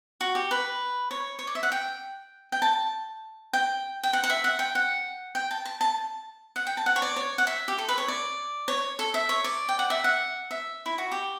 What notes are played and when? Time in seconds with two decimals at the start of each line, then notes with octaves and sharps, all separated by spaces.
0.21 F#4
0.35 G4
0.51 B4
1.11 C#5
1.39 C#5
1.47 D5
1.55 E5
1.63 F#5
1.72 G5
2.52 G5
2.62 A5
3.53 G5
4.03 G5
4.13 F#5
4.24 F#5
4.30 E5
4.44 F#5
4.59 G5
4.75 F#5
5.35 G5
5.51 A5
5.66 A5
5.81 A5
6.56 F#5
6.67 G5
6.77 A5
6.86 F#5
6.96 C#5
7.02 D5
7.16 C#5
7.38 F#5
7.47 E5
7.68 G4
7.78 A4
7.88 B4
7.98 C#5
8.08 D5
8.68 C#5
8.99 A4
9.14 E5
9.29 C#5
9.44 D5
9.69 G5
9.79 F#5
9.90 E5
10.04 F#5
10.51 E5
10.86 E4
10.98 F#4
11.12 G4